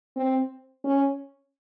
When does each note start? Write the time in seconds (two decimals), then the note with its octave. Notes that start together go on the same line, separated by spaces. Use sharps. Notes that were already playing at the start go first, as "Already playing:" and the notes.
0.16 C4
0.84 C#4